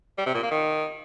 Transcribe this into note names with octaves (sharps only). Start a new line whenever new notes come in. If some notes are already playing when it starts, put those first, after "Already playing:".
G3
C3
A#2
A#3
D#3